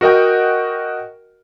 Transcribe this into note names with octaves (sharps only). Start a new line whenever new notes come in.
F#4 A#4 D#5 F#5 G5